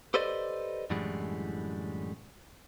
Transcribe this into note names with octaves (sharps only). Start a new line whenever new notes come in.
G4 A4 B4 C5 D5 D#5
F#2 A2 D3 E3 G3 G#3